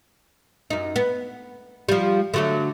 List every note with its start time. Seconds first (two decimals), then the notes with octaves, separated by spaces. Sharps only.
0.70 F#2 D#4
0.96 B3
1.89 F3 G3
2.34 D3 F#3 A3